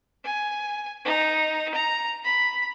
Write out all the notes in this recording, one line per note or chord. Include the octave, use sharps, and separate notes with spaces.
G#5
D#4
A#5
B5